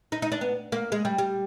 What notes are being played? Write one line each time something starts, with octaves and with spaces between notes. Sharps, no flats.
D#4
D#4
D4
B3
A#3
G#3
G3
G3